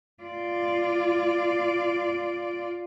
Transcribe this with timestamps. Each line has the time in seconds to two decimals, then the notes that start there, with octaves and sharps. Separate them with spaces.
0.24 F4 D5